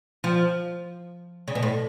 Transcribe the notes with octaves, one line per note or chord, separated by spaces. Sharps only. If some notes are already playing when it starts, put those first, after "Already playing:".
F3
C#3
B2
A2